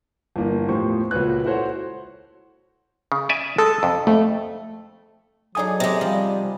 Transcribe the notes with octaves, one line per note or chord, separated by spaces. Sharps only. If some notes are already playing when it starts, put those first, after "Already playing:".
G1 E3 A#3
E2 A2 F3 G4 C5 C#6
C#2 A#2 F#4 B4 C#5 F#6
E4 F#4 A4 C5 C#5 F#5
C#3
D5 E5 G#5
G#3 A4
F2 C3
F2 A3
F#3 A3 D#4 G#4 D5 G#5 D#6
C3 G#3 G4 A#5
F3 G3